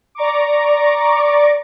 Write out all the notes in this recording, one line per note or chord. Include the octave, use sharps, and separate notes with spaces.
D5 A#5 C#6 D6